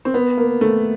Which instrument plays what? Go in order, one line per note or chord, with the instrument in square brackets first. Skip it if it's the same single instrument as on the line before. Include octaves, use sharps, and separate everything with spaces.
[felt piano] C4
B3
A#3
A3